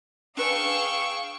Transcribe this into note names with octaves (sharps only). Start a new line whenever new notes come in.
D4 G#4 B4 D5 F5 G5 C#6 E6